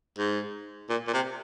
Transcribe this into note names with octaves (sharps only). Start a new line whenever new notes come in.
G#2
A#2
A#2
C3